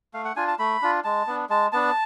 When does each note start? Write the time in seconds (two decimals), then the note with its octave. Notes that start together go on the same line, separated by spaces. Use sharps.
0.14 A3 F5
0.25 F#5
0.36 D4 F4 G#5
0.48 A5
0.59 A3 B5
0.82 D4 F4
1.04 G#3 A5
1.27 B3 D4
1.50 G#3 A5
1.72 B3 D4 A5